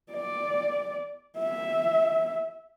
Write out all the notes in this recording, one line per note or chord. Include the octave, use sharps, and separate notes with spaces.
D5
E5